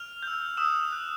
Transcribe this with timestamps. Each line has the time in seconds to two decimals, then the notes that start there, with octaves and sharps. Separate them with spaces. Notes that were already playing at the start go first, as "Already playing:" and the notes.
Already playing: F6 F7
0.23 E6 G6
0.57 D#6 E6 E7
0.92 F#6